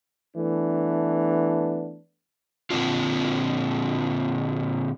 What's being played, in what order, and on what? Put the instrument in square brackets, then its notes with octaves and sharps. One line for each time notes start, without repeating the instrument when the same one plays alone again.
[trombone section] E3 A3 B3 D4
[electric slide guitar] A#2 D3 C4 D4 F4